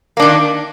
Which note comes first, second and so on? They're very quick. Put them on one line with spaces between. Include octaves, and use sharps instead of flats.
A#3 D4 D#3